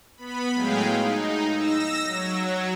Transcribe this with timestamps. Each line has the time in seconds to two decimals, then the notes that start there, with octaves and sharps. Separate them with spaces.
0.17 B3 B5
0.54 A2 F#3 G#3 G#4 F5 G5
0.98 D#4
1.53 E6 A#6
2.06 F#3